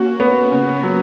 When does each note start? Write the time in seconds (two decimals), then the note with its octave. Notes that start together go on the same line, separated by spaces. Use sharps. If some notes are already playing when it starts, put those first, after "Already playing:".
Already playing: A#3 C#4 F#4
0.20 B3
0.52 C#3 A#3 C#4
0.83 F#3